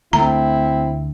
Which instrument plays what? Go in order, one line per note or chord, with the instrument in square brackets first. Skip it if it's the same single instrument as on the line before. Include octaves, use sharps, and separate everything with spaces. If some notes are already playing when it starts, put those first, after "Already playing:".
[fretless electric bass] D2 A3 [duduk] C4 [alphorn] E4 [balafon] A#5